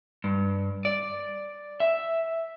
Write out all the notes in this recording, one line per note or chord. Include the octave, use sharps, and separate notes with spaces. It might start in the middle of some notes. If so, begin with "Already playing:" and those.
G2
D5
E5